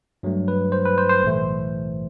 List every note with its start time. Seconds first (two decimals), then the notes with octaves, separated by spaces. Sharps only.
0.23 G2 F#3 A3
0.48 B4
0.72 C5
0.85 B4
0.98 C5
1.10 C5
1.22 B1 A2 E3 A3